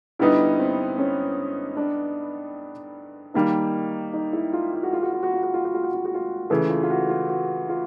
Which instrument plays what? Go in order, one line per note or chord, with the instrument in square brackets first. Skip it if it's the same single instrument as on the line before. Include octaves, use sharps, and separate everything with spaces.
[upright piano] G2 D3 G3 B3 D#4 [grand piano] E4
[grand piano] C4
C#4
D4
[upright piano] D#3 G3 A#3 [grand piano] D#4
[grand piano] D#4
E4
F4
F4
F#4
F4
F#4
F4
F#4
F4
F#4
F4
F#4
F4
F#4
F4
F#4
F4
[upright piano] C#3 E3 A3 [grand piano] E4
[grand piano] F4
F4
F#4
F4
F#4
F4